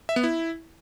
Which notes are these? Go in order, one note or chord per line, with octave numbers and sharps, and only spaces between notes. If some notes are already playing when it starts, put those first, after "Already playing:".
E5
B3
E4